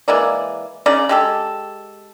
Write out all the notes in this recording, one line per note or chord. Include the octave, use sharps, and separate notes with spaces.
E3 G#3 A#3 D5
C#3 D#4 D5
G#3 G4 A4